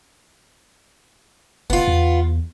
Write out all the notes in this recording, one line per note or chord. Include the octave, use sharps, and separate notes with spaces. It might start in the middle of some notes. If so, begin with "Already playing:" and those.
F#1 B3 F4
E2